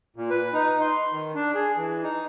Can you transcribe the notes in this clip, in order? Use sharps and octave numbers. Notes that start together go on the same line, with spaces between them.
A#2
B4
D#4
C6
D#3
D4
G#4
E3
D#4